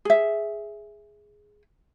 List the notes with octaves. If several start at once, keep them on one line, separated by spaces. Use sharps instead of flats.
G#4 E5